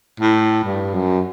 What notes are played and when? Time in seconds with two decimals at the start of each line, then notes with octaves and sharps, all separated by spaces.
0.20 A2
0.64 G2
0.94 F#2